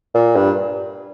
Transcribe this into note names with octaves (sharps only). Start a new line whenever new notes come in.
A#2
G2